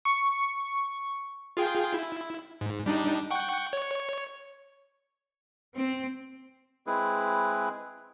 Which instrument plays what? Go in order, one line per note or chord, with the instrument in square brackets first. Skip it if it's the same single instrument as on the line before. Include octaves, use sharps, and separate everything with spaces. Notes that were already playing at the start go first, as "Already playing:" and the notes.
[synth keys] C#6
[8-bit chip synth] F4 G#4 G5
E4
G#2
G3 D4 D#4
F#5 G5 C#6
C#5
[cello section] C4
[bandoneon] G#3 C4 E4 G#4 B4